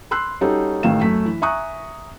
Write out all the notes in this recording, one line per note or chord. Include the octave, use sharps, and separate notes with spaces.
B5 C6 E6 F#6 C7
G3 C#4 D#4 F#4 G4 A4
A1 D#3 A3 F5 E7
F#2 A3 B6
E3
E5 G#5 A#5 C#6 D#6 F#6